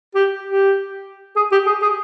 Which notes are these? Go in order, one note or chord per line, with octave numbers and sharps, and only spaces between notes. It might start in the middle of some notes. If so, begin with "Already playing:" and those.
G4
G4
G#4
G4
G#4
G#4